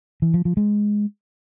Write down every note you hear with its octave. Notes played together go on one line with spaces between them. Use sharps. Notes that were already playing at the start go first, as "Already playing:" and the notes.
E3
F3
F3
G#3